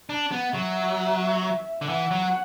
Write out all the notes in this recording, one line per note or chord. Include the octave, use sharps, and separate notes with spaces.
D4
B3
F#3 E5
D3
E3 F#5
F#3